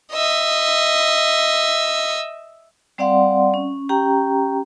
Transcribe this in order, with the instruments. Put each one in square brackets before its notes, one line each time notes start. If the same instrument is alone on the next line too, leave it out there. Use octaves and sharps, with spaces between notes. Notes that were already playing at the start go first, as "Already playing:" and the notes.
[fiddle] D#5 E5
[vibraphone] G3 C4 D5 F5 F#5 C6
C#4
C#4 G4 G5 A#5